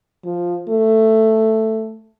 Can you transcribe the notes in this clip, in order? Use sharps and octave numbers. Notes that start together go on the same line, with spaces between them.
F3
A3